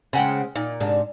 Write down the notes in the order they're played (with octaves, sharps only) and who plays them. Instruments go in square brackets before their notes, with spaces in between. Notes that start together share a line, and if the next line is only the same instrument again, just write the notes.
[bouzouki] C#3 F#5 G5 [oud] G#3 C4 C#4
[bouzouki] A#2 [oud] D#4
[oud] G#2 C3 D4